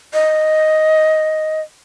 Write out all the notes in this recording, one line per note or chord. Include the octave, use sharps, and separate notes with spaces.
D#5